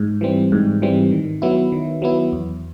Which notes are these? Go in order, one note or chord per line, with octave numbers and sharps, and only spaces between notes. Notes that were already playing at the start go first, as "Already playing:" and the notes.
Already playing: G#2
E3 G3 C4
G#2
E3 G3 C4
D#3
F#3 B3 E4
D#3
F#3 B3 E4
E2